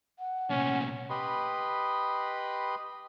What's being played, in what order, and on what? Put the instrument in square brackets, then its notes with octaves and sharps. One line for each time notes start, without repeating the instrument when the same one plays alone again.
[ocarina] F#5
[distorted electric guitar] C2 A#2 [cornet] C#4
[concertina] G4 B4 D#5 B5 C6